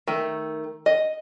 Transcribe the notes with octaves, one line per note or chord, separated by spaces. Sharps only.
D#3 A3
D#5